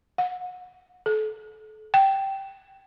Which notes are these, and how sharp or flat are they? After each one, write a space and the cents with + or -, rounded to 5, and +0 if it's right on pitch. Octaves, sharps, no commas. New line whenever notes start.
F#5 -30
A4 -30
G5 -10